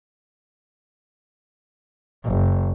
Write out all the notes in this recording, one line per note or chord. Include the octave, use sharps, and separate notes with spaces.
F#1